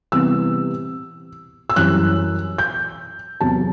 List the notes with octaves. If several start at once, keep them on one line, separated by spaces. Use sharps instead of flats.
C3 E3 G3 B3 E6
E6
F#2 E3 G3 C4 F#6
G6
E2 C3 F#3 A5